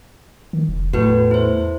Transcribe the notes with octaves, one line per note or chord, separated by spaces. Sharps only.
D#3
F1
E2 A2 F#4 B4
E4 C5